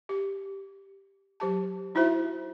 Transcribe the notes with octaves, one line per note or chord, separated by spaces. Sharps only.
G4
F#3 G4 A5
D#4 E4 F#4 C5 E5